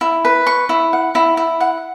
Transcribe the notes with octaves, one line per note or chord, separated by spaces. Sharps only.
E4
B4
C#6
E4
F#5
E4
E4
F#5